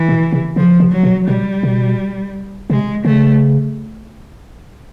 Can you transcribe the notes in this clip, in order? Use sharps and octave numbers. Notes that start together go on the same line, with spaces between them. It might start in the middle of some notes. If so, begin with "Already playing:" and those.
Already playing: E3
B2
C3
C#3 F3
C3
F#3
B2
B2 G3
B2
C3 G#3
C#3 A3